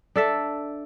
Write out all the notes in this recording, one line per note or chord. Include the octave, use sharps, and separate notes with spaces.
D4 A4 E5